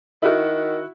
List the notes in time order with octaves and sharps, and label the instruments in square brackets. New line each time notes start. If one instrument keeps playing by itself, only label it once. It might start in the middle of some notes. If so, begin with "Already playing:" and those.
[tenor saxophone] D#3 [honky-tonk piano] E4 F#4